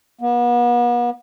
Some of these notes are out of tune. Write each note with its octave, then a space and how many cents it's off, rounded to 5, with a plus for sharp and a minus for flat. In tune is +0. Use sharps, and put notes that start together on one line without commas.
B3 -40